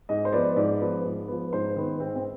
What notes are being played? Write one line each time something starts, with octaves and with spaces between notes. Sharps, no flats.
G#2 D#5
C5
F3 B3 D5
G#2 D5
F3 B3
G#2
F3 B3
G#2 C5
D#3 B3
G#2 C4
C4